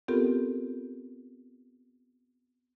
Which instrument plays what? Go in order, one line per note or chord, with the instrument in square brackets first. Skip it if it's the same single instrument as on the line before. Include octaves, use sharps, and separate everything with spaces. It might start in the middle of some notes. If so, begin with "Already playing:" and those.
[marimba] B3 C4 F4 G4 A4 A#4